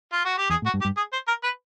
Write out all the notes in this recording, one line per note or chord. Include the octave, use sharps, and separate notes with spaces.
F4
F#4
G4
E2 G#4
A2
F#4
G2
G4
G2
G#4
C5
A#4
B4